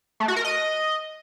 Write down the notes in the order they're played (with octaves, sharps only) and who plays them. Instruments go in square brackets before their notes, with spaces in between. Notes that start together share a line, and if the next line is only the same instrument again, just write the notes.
[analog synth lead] A3
F#4
A#4
D#5